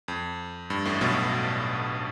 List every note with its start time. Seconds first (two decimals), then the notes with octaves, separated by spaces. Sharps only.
0.08 F2
0.70 G2
0.85 A1 A2
1.01 B1 B2
1.12 B2